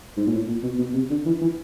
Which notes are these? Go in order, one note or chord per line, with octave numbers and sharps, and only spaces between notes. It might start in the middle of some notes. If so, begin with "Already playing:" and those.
G#2
A#2
A2
A#2
B2
B2
C3
D3
E3
E3